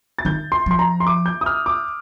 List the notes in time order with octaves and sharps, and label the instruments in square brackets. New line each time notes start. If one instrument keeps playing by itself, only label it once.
[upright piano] A6
[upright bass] D#3 [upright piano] G6
[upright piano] C6
[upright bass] F3 [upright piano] C6
[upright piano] A#5
C6
D6
G6
D#6
F6
D6